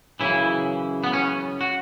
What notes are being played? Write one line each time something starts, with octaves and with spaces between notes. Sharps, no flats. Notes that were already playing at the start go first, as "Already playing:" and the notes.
F#2 C#3 E3 E4
B3
C#4
F#4